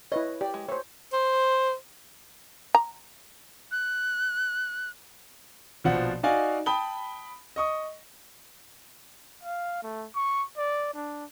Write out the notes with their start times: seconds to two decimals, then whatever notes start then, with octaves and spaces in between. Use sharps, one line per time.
0.12 E4 B4 C#5 D#5
0.41 G4 D5
0.54 G#3
0.69 A3 C5 C#5
1.13 C5
2.75 A#5
3.71 F#6
5.84 A#1 B2 F3 F#5
6.23 D#4 F#4 D5 F5 G#5
6.66 G5 A5 B5 D#6 G7
7.56 D#5 C#6 D#6
9.43 F5
9.83 A3
10.16 C#6
10.57 D5
10.94 D4